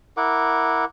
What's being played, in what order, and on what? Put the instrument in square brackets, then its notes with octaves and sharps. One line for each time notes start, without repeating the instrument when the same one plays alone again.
[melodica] E4 A#4 F#5 D6